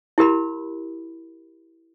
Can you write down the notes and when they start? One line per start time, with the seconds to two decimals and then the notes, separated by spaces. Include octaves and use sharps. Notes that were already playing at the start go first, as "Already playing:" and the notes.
0.18 E4 G4 A#4 B5